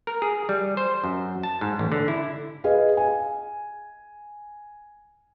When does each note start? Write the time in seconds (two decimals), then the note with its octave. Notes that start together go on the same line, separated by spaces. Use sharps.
0.07 A#4
0.22 G#4
0.49 G3
0.77 C5
1.04 F#2
1.43 A5
1.61 G#2
1.79 A1
1.92 D3
2.08 E4
2.64 G#4 B4 D#5 F5
2.97 G#5